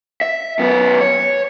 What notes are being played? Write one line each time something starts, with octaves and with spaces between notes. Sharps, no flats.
E5
F#2 B3
C#5